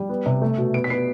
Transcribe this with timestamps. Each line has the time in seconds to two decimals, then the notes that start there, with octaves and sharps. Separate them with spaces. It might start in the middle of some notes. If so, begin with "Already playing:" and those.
Already playing: G3
0.09 B3
0.26 C3
0.42 A3
0.58 B2
0.74 B3 D7
0.84 B6
0.90 B3 C7